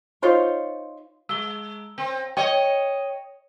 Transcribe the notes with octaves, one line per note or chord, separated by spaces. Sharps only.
D#4 F4 C5 C#5
G#3 E6 G7
C4
C#5 D#5 G5